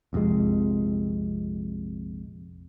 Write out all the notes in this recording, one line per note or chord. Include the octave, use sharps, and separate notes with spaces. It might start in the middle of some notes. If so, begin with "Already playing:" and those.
A#1 F2 C3 G#3